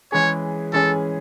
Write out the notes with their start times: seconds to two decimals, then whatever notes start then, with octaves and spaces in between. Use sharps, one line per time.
0.12 E3 G#3 C#4 G#4 C#5
0.73 E3 G#3 C#4 G#4 A4